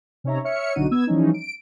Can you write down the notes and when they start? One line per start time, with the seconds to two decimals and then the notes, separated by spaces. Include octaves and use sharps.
0.24 C3 C#4 D#4 C#5 E5 A#5
0.44 C#5 E5 F6 C#7
0.75 B1 D3 D4 D#4 F#4 D#7
0.91 B3 E6 G#6
1.07 E3 F3 G3 C#4 D#4
1.34 D7